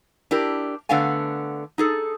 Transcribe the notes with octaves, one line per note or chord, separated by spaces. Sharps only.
D4 E4 G4 A#4
D3 A3 B3 D4 F5 G#5
D#4 G#4 A4